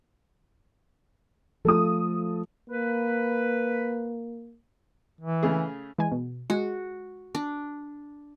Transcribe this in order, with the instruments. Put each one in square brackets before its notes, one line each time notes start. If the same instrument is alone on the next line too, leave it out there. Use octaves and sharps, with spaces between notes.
[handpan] F3 A3 F4 [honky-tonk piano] A4 D#6
[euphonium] A#3 [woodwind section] B4
[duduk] E3
[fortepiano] C#3 A3 G#4
[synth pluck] E3 G#3 G#5
B2
[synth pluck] G#3 [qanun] F#4
[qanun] D4